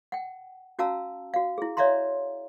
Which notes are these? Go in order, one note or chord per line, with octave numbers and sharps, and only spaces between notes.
F#5 G5
C#4 F#4 F5 A5 A#5 E6
F#4 F5
E4 G#4
C#5 D5 E5 F5 A#5 C6